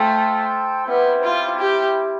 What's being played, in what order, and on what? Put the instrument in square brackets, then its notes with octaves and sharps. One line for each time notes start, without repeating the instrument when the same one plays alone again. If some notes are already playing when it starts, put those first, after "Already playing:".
Already playing: [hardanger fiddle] A3 [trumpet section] F4 A4 C5 G5
[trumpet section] G3 C4 E4 [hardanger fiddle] B3
[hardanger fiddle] F4
G4